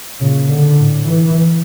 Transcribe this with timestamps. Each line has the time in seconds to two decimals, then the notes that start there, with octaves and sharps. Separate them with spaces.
0.20 A#2 C#3
0.48 D3
0.77 A2
1.06 E3